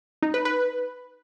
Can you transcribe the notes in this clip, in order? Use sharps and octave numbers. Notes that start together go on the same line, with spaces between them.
D#4
B4
B4